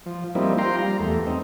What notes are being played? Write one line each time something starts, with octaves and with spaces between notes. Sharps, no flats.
F3
F3 G3 A#3 C4 D#4 E4
F4 G5 A#5 C6
G3 A#5
E2 A3
C4 D#4